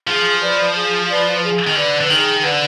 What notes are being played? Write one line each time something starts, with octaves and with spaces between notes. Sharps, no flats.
F3 G#4
B4 D5
G#4
B4 D5
G#4
D#3
D3 B4 D5
D3
D#3 G#4
D3 B4 D5